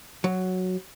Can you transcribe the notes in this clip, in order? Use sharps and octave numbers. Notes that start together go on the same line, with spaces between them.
F#3